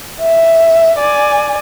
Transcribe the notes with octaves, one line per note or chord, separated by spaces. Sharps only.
E5
D5 G#5